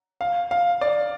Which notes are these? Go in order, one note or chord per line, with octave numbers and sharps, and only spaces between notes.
F5
F5
D5